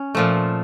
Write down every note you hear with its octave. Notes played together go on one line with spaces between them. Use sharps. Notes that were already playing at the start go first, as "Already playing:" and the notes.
Already playing: C#4
A#2 F3 A3